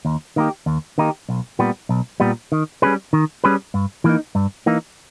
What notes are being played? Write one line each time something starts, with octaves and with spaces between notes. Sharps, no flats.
D#2
D#3 A#3 D#4 G4
D#2
D#3 A#3 D#4 G4
B1
A#2 G3 B3
B1
A#2 G3 B3
D#3
G3 C#4 G#4 B4
D#3
G3 C#4 G#4 B4
G2
E3 A#3 D#4
G2
E3 A#3 D#4